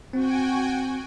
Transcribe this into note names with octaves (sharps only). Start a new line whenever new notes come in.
C4 F#4 G5 G#5